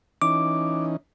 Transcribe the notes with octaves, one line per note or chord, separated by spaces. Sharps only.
E3 C#4 D#4 D6